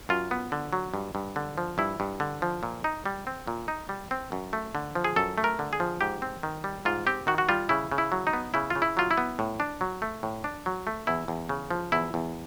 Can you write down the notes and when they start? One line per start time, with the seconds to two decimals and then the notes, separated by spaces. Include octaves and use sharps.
0.09 F#2 F4
0.31 B3
0.52 D3
0.73 F#3
0.94 G2
1.15 G2
1.36 D3
1.58 F3
1.78 G2 E4
2.00 G2
2.20 D3
2.42 F3
2.63 A#2
2.84 D#4
3.06 G3
3.27 C4
3.47 A#2
3.68 D#4
3.89 G3
4.11 C4
4.32 F#2
4.53 A3
4.75 D3
4.95 F3
5.04 G#4
5.16 F#2 A4
5.38 A3
5.44 A#4
5.59 D3
5.73 G#4
5.80 F3
6.01 G#2 G4
6.22 C4
6.43 D#3
6.64 G3
6.85 G#2 F4
7.07 C4 G4
7.27 D#3 F#4
7.38 F#4
7.49 G3 F4
7.69 C#3 E4
7.92 C#3
7.98 E4
8.12 F#3
8.27 D#4
8.33 B3
8.54 C#3 E4
8.70 F4
8.75 C#3
8.82 E4
8.97 F#3 F4
9.11 E4
9.18 B3
9.39 A2
9.60 D4
9.81 F#3
10.02 A3
10.23 A2
10.44 D4
10.66 F#3
10.87 A3
11.07 E2 E4
11.28 E2
11.49 C#3
11.71 F3
11.92 E2 E4
12.14 E2